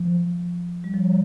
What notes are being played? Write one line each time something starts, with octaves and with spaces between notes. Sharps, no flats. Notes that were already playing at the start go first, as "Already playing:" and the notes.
Already playing: F3
G3
F3
G3